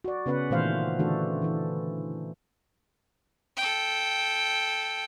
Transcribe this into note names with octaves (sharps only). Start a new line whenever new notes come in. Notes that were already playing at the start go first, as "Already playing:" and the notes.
F#4 D5
C#3 B3 C#4 B4 F#5
A#2 D#3 E3 A3 C5 F5
D3 E3 A3 D4 F#4 A4
E3 A4
A4 G5